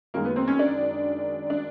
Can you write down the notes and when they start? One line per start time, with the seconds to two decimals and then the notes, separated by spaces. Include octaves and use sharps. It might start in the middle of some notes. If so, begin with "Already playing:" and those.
0.14 F#2 D#3 G#3 A#3
0.25 B3
0.36 C4
0.48 C#4
0.59 D4
1.50 D4